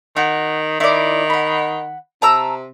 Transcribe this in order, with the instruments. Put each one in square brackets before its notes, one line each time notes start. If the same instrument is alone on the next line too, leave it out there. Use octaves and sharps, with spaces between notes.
[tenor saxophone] D#3 [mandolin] F#4
[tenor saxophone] D#3 [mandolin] E4 D5
[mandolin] F#5 B5
[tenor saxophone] C3 [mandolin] A5 A#5 E6